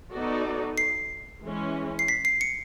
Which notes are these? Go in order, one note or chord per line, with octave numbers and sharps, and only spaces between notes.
B3 D#4 F#4 A4 D5
C7
E3 G#3 C#4
C7
B6
C7
C#7